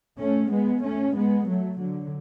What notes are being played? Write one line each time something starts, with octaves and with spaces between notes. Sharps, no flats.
A3 C#4
G#3 B3
A3 C#4
G#3 B3
F#3 A3
D3 F#3